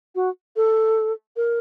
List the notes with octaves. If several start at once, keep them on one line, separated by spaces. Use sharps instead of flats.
F#4
A4
A#4